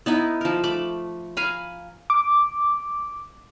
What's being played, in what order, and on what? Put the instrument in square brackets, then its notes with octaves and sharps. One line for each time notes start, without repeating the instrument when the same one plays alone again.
[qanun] B3 D#4 E4
F3 A#4
A3 B5 D6
F5 G#5 A#5 B5
[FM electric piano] D6